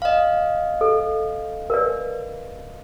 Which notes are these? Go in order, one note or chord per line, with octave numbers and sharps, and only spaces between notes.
D#5 F5
A4
A#4 B4 D5